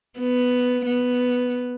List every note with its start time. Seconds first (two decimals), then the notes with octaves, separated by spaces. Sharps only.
0.19 B3
0.86 B3